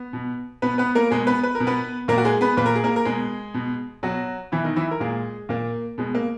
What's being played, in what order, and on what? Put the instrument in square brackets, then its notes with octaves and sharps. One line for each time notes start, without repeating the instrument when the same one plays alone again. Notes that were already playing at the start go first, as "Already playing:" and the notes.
Already playing: [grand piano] B3
B2
B2 B3 B4
B3 B4
A#3 A#4
B2 G#3 G#4
B3 B4
B4
A#4
B2
B3 B4
A#2 A#3 A#4
F#4
G#3 G#4
B3 B4
A#2 B4
A#4
G#4
A#3 A#4
A#4
B2 G#3 G#4
B2
B2 F#3 F#4
B2 E3 E4
D#3 D#4
E3 E4
A#4
A#2 G#3 G#4
A#2 A#3
B2 G#3
A#3